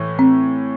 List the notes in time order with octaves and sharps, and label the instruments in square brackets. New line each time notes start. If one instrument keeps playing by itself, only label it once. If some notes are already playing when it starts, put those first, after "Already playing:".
Already playing: [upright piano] A2 E3
[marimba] C4